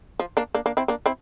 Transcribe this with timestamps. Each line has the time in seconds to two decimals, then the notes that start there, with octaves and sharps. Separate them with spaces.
0.19 F3
0.37 A#3 D4
0.54 A#3 D4
0.66 A#3 D4
0.77 C4 E4
0.88 A#3 D4
1.06 C4 E4